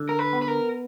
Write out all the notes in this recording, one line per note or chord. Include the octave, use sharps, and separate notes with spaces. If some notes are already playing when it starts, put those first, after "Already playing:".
Already playing: D3
A#4
B4
B3
B4
A#4